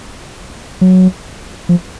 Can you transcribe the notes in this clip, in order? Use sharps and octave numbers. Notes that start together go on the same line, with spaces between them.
F#3
F3